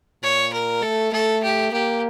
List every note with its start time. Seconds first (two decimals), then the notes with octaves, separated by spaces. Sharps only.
0.23 A#2 C#5
0.53 A#4
0.83 A3 A4
1.12 A3 A4
1.43 G4
1.73 A#3 G4